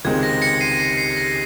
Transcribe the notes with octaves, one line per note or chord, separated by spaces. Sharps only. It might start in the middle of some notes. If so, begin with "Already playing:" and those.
C#2 C3 D#3 G#3 C4 G#6
A#6
A#6 C#7
C7 D#7
C7
C7
A#6